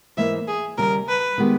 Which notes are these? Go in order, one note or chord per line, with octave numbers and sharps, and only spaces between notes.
G#2 E3 A#3 E5
G#4
D#2 C#3 G3 A#4
B4
D#3 G#3 B3 G4